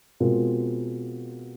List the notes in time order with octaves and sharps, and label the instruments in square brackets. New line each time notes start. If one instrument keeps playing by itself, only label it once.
[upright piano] B2 G#3 C4 F4 A#4